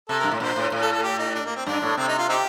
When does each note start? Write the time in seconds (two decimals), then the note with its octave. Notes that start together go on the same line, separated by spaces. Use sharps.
0.09 C3 A4
0.19 G2 A#4
0.32 A2
0.40 A#2 C5
0.56 A2
0.72 A2
0.82 A4
0.93 A4
1.03 G4
1.19 D#4
1.35 D4
1.45 A#3
1.56 C4
1.66 G2 D4
1.82 A2
1.97 C3 C4
2.08 D#4
2.18 F4
2.29 C4 D#4 G4